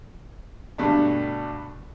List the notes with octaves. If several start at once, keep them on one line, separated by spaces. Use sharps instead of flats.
G2 B2 D3 A3 D4